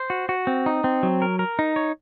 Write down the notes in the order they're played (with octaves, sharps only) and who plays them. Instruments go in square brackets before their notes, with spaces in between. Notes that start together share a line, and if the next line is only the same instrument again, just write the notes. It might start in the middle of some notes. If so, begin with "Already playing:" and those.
Already playing: [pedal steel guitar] C5
F#4
F#4
C4
D#4
C4
F#3
A#4
A#4
D#4
C#5